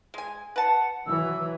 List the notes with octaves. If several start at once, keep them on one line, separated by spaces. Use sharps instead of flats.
G#3 G#5
B4 F#5 A5
E3 F#3 E6